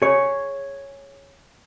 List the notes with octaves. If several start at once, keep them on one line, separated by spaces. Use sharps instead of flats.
G#4 C#5